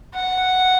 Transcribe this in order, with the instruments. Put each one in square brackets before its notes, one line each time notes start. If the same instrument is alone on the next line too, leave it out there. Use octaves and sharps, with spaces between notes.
[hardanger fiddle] F#5